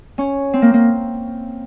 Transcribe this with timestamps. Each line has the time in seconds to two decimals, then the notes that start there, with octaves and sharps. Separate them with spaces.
0.18 C#4
0.53 C4
0.62 A#3
0.74 A#3